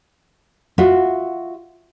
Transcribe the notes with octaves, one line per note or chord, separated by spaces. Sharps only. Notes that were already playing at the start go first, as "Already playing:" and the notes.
F4 F#4 E5